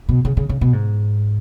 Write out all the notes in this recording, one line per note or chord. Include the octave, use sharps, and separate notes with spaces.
B2
C#3
C#3
C#3
B2
G#2